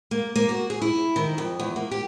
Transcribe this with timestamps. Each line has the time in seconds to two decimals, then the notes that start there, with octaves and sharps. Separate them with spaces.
0.11 A#3
0.36 A#3
0.49 F#4
0.70 G#4
0.82 E4
1.16 D#3
1.38 F2
1.59 E2
1.76 A#3
1.91 G4